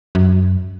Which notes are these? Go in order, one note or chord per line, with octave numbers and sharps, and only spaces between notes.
F#2